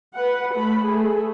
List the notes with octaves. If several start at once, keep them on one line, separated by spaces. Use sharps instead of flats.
B4 F#5
A3 B5
A3 G#4